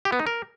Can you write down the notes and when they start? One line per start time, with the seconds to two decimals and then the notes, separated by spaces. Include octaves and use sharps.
0.05 G4
0.12 B3
0.19 D#4
0.27 A#4